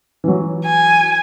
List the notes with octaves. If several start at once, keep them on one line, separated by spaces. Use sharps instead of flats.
E3 F#3
G#5